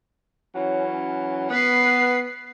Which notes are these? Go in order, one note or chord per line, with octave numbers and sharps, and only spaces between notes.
E3 F#3 C#4
B3 B4 C7